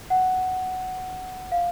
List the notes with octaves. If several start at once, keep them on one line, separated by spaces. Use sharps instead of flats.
F#5
F5